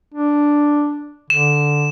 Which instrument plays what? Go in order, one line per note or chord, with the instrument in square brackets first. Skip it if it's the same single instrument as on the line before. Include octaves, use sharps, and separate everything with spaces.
[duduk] D4
[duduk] D3 [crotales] E7